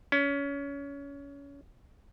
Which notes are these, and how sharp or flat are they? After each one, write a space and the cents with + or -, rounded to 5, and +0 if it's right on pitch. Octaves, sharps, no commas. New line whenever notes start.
C#4 +25